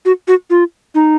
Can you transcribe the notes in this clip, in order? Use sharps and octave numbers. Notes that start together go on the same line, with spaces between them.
F#4
F#4
F4
D#4